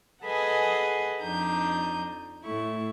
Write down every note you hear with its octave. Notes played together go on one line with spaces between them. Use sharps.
G#4 A4 B4 D#5 F#5 G#5
F2 D4 D#4 G6
A2 A3 E4 C#6